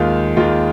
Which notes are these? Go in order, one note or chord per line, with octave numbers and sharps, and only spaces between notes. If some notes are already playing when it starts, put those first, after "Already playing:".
Already playing: D#2 D#3 G#3 F4
D#2 D#3 G#3 F4